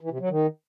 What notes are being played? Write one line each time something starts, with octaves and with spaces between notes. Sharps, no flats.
E3
C3
F#3
D#3